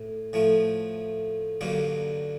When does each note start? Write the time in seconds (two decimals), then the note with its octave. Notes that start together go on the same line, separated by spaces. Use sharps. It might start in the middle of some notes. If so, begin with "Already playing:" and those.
Already playing: A2
0.33 A2 F3 A3
1.61 G2 D3 F#3 A#3 D#4